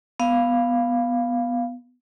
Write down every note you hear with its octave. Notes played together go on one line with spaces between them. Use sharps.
B3 F5